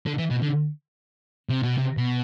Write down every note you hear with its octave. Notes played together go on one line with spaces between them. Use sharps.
D3
E3
B2
D3
C3
B2
C3
B2